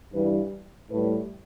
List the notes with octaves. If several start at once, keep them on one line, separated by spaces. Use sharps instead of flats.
G2 E3 G3 B4
A2 G3 B4